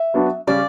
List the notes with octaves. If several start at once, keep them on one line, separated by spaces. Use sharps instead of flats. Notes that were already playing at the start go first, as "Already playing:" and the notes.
Already playing: E5
F#3 B3 D4 F#4
C#3 G3 C#4 D5